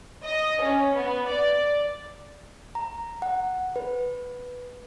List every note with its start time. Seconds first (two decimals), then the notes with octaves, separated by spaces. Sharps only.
0.24 D#5
0.61 C#4
0.95 B3
1.26 D5
2.75 A#5
3.22 F#5
3.76 B4